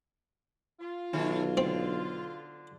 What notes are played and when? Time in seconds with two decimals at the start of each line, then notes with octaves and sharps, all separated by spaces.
0.80 F4
1.13 B1 D#3 A3 C#5
1.57 D3 C4